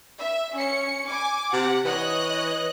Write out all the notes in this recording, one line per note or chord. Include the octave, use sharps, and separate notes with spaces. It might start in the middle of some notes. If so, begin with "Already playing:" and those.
E5
C#4 C#7
G#5 D6
C3 F#5
E3 C#5 D#5 F#6